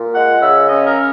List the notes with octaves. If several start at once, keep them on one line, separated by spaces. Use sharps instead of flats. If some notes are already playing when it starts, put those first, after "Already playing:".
Already playing: A#2
G#3 F#5
C#3 E5
C#4 D#5
A#4